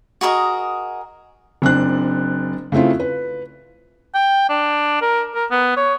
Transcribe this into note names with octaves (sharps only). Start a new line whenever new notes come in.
F#4 G#4 A#4 D#5
F#1 C4 D4 F#6
C#3 A3 C4 E4 F4
B4
G5
D4
A#4
A#4
B3
C#5